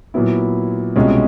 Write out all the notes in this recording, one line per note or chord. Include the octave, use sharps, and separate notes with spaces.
A#2 F#3 B3 E4
C2 B2 G#3 C#4 F4